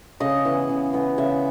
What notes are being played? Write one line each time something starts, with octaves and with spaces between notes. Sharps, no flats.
C#3 D#5
E3 B3
C#3
E3 B3
C#3 E5